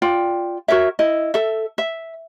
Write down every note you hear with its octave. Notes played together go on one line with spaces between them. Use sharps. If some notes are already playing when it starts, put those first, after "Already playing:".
F4 D5 G5
F#4 A#4 C#5 E5
E4 D#5
A4 E5
E5